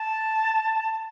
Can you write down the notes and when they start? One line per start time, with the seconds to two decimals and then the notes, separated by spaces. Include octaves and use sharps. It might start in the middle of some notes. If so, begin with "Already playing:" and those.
Already playing: A5